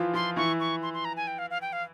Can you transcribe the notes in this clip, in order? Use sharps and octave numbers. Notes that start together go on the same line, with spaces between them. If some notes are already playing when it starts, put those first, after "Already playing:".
Already playing: E3 F3 E4 F4
F3 F4 C6
E3 E4 C#6
C#6
C6
C6
A#5
G#5
G5
F5
F5
G5
F5